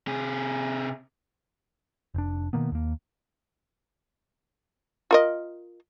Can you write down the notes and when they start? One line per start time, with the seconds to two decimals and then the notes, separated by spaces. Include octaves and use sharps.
0.07 C3 G#4
2.14 F1 D4
2.53 B2 D#3 A#3 B3
2.72 D#2 A#3
5.11 F4 A#4 D#5